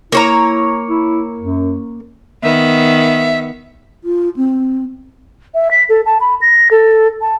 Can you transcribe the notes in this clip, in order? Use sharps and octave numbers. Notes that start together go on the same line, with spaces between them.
A#3 E4 C#5 A#5
E4
F#2
D#3 B3 E5
F4
C4
E5
B6
A4
A5
B5
A#6
A4
A5